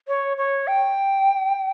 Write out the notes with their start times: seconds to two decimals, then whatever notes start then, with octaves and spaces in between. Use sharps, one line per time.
0.08 C#5
0.37 C#5
0.67 G5